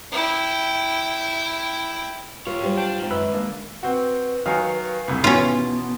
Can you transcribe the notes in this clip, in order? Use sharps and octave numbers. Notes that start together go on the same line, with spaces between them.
E4 G5
F4 G4 A#4 C#5
F#3 G3 C5
D4 G5
G#2 D#3
F#2 B4 B5 E6
A#3 D4
C4 F#4 B4
D#3 F#3 F5 G#5 C#7
E1 C2
B2 D#3 E3 B3 C#4 F4 C6